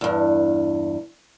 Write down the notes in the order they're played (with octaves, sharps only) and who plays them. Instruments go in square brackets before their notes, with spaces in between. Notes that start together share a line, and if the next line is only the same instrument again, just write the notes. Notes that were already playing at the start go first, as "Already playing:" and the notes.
[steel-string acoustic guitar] E2 G2